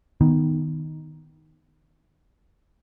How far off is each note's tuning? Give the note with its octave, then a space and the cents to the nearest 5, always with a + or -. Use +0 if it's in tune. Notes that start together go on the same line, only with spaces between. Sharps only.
D#3 +0 B3 +0